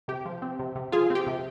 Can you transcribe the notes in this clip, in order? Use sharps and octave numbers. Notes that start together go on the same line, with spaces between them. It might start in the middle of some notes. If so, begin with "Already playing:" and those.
C3 G4
F3
C4
C3
C3
F3 F4 G#4
C4
G4
C3